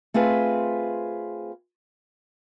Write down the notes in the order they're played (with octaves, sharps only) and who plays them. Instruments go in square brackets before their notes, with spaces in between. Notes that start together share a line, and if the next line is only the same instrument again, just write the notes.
[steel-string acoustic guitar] A3 C4 F4 G#4 B4